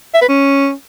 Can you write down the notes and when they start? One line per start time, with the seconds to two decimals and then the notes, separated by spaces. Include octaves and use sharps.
0.14 E5
0.21 B4
0.29 C#4